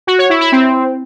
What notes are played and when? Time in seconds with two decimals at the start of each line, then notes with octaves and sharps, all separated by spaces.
0.07 F#4
0.18 C#5
0.30 E4
0.41 E4
0.52 C4